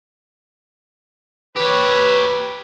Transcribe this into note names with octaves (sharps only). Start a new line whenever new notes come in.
G4 B4 C#5